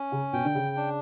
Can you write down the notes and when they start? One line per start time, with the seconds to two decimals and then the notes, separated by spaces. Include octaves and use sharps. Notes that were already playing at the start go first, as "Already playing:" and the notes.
Already playing: C#4
0.12 C#3
0.33 B2 G5
0.45 D3
0.55 C#3
0.76 D4